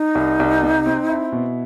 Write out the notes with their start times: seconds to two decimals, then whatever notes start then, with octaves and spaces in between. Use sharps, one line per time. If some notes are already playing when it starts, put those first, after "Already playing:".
Already playing: D#4
0.15 C2
0.40 C2
0.63 C3
0.86 C4
1.09 E4
1.32 B2